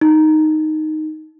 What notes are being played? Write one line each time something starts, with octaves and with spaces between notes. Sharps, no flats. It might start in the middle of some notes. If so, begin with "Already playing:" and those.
D#4